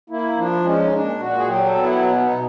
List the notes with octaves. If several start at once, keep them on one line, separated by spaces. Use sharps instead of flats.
A#3 E4
F3 D4
G#3 C#4
D#4
A#2 D4
A#2 F#4
G#4
F#3 G4
A4
B3
E4
B2
D#4
B2